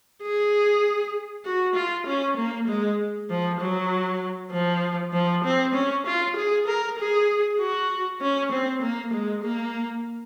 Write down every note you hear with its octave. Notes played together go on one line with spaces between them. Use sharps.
G#4
F#4
F4
C#4
A#3
G#3
F3
F#3
F3
F3
C4
C#4
F4
G#4
A#4
G#4
F#4
C#4
C4
A#3
G#3
A#3